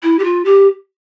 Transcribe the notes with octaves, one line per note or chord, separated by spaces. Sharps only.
E4
G4
F4
G4